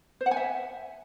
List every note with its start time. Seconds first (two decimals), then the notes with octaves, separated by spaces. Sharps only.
0.21 C5
0.26 F#5
0.31 G#5
0.37 E5